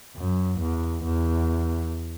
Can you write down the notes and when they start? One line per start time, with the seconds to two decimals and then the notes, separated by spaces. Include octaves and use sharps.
0.16 F#2
0.60 E2
1.05 E2